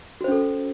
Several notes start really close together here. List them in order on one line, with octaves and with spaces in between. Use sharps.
F#4 C5 C#4 A4